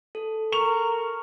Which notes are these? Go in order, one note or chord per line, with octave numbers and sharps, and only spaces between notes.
A4
A#4 C#6 F7